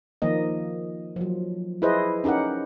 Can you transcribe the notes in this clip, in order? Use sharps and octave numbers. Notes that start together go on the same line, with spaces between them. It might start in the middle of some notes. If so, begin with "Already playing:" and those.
D#3 F3 A#3 D#5
F3 F#3
E4 G#4 B4 C5 D#5
C#4 D#4 G4 A#4 F#5